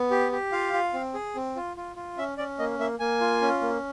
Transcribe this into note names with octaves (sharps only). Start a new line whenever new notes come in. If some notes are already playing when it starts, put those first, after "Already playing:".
Already playing: B3
G4
G4
F4 F5
F4
C4
G#4
C4
F4
F4
F4
C#4 E5
C#4 D5
A#3 D#5
A#3 E5
A#3 G#5
F4
C#4
A#3